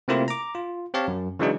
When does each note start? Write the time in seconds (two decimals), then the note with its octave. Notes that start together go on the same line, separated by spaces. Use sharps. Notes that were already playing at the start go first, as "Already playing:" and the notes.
0.08 C3 A3 A#3 C4 E4 F4
0.28 A#5 D6
0.55 F4
0.94 C4 G4 C#5 F5 A5
1.08 F#2
1.39 C#3 E3 F#3 G#3 D4 D#4